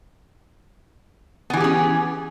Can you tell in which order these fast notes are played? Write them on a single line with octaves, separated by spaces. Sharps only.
B3 E3 G4 G#4 C#4